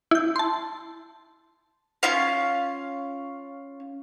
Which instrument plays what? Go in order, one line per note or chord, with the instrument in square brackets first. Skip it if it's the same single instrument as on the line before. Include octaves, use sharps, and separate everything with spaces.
[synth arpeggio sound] E4 G6
A5 C6
[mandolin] C#4 F4 F5